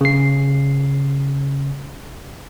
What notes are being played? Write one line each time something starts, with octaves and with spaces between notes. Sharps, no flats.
C#3 C7